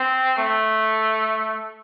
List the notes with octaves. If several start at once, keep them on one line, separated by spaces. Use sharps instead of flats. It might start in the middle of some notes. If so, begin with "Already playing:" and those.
Already playing: C4
A3